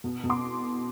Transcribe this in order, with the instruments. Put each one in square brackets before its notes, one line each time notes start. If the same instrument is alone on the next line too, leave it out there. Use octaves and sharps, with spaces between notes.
[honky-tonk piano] B2
B2
C6 D6